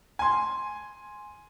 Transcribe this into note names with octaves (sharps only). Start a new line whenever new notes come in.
G#5 C6